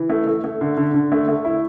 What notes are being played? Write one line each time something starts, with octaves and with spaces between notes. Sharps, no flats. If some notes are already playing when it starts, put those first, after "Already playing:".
Already playing: E3
A3
A3
A3
D3
D3
D3
A3
A3
E4